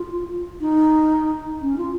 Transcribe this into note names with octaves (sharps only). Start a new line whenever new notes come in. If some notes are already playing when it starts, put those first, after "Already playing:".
Already playing: F4
D#4
C#4
F4